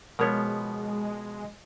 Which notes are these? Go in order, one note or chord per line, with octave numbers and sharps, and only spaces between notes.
B2 F3 G#3 B3 A#4 C#5